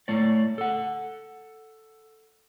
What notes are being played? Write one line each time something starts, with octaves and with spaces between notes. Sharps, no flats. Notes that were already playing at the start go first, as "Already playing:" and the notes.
A2 A3 C#5 D5
A4 F#5